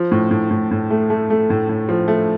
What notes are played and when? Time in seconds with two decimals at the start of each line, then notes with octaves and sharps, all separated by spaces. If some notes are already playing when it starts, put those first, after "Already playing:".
Already playing: F3
0.11 A2
0.31 A2
0.51 A2
0.71 A2
0.90 A3
1.10 A3
1.30 A3
1.50 A2
1.69 A2
1.89 F3
2.08 A3